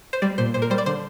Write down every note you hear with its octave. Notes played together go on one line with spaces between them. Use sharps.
C5
G3 D5
A#2 C5
A#2 C5
A#4
G3 C5
D5
D3 C5